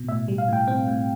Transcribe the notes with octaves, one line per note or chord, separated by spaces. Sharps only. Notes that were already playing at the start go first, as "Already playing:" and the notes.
Already playing: B2
A2 E5
G3
F5
A2 G5
C4 G5
A2